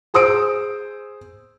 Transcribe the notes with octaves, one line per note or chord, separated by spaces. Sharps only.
G#4 C5 D#6 E6 D7